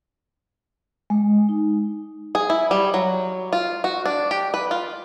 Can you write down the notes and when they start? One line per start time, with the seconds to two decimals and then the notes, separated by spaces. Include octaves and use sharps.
1.10 G#3
1.49 D#4
2.35 G#4
2.50 E4
2.71 G3
2.94 F#3
3.53 F4
3.84 F#4
4.06 D4
4.31 G4
4.54 B4
4.71 F4